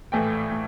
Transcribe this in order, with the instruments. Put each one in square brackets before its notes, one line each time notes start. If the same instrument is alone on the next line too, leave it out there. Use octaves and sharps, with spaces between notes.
[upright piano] A#1 A2 E3 A3 G5
A2